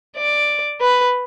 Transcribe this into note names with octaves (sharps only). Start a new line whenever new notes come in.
D5
B4